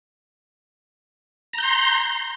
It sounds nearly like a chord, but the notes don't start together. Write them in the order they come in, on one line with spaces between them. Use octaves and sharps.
A#5 G6 C6